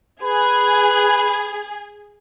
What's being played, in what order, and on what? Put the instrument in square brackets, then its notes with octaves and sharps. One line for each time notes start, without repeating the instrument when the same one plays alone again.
[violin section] G#4 [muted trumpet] B4